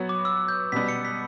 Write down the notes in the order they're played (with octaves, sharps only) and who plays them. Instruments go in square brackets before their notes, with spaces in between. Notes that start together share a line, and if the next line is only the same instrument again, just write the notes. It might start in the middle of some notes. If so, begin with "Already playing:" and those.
Already playing: [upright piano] F#3 B3 F#4 C#5
[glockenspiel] D6
E6
G6
[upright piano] B2 G3 B3 [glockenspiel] B6
[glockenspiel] C#7
B6